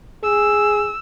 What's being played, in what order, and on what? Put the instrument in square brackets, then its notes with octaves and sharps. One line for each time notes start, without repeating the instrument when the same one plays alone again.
[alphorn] G#4 [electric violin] E6